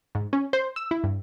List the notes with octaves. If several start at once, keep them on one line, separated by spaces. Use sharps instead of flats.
G#2
C#4
C5
E6
E4
G2